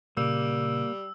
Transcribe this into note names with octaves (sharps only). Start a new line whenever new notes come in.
A#2 C#3 G3 A#3 E6